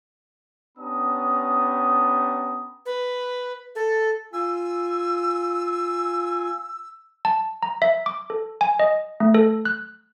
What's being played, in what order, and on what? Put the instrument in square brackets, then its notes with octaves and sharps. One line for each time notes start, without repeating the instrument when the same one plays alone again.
[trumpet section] B3 C#4 D4 G4 A#5 D#6
[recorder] B4
A4
[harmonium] F4 G#5 [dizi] E6
[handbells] A5
A#5
E5
D6
A4
G#5
D#5
A3
A4
F#6